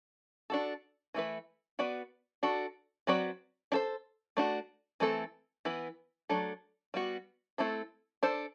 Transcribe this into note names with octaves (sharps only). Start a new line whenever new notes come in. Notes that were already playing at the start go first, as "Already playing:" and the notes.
D4 F#4 A4
E3 A3 E4 B4
B3 F#4 B4 D5
D4 F#4 A4
F#3 C4 F#4 B4 D5
D4 A4 C5
A3 D4 F#4
E3 A3 C4 E4 A4
E3 B3 E4 B4
F#3 A3 D4 A4
G3 B3 F#4
A3 C4 E4 A4 C5
D4 A4 C5